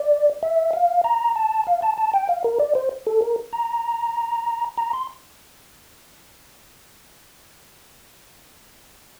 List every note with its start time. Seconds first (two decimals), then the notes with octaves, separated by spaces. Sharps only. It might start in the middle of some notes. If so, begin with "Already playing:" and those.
Already playing: D5
0.43 E5
0.73 F5
1.04 A#5
1.36 A5
1.67 F5
1.82 A5
1.98 A5
2.14 G5
2.29 F5
2.44 A#4
2.60 D5
2.75 C5
3.07 A4
3.22 A#4
3.53 A#5
4.77 A#5
4.93 C6